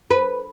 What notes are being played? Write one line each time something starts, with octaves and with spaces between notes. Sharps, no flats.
B4